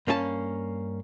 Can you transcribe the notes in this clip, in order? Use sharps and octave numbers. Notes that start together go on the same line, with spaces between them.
G2 A#3 C#4 G#4 A5